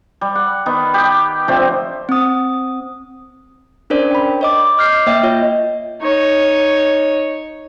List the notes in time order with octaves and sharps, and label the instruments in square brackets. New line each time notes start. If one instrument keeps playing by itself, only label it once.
[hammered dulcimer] G3
F#5
D#3 B3
G4 G5
D3 F3 A3 C4
[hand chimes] C4 D#6
C#4 D4 A#4 C5 D5
G5 B5
C#5 D#5 D6
D6 F6 G6 C7
A#3 C#5 D#5 E5 G5
F4 C#5
[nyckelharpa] D#4 C#5